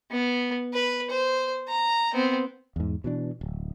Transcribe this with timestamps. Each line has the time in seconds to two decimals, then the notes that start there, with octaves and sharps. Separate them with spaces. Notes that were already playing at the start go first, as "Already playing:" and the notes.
0.11 B3
0.73 B4
1.10 C5
1.69 A#5
2.13 B3 C4
2.76 E2 G#2
3.04 B2 E3 D4
3.41 D1